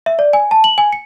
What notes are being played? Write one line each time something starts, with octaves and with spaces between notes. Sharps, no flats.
E5
D5
G#5
A5
F#7
G#5
C#7